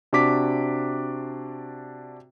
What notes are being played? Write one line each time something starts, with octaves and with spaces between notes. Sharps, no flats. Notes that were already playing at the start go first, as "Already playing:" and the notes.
C3 D4 F#4 D6 B6